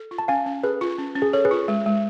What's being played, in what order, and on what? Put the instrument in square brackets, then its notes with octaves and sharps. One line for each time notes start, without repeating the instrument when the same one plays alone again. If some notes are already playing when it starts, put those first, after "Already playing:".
Already playing: [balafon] A4
F4
[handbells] A5
[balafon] C#4 [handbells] F5 G#5
[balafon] C#4
[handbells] G#4 B4 [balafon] A4
[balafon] F4
C#4
C#4
[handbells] G#4
[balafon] A4 [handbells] C#5
[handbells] G#4 B4
[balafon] F4
G#3
G#3